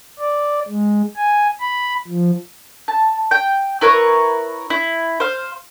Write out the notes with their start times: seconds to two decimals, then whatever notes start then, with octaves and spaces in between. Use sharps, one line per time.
0.19 D5
0.68 G#3
1.16 G#5
1.61 B5
2.08 F3
2.88 A5
3.31 G5
3.81 E4 A#4 B4 C#5
4.70 E4
5.20 C5 F5